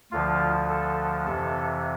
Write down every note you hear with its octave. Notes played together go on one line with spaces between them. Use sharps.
D2 D3 F3 F4
A4
F2 C3 E3 A4